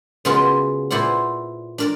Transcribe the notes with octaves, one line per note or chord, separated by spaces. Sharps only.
C#3 G#3 B3 F4 F#4 A#4
A#2 B3 E4 C5 D5 F#5
D4 A#4 D5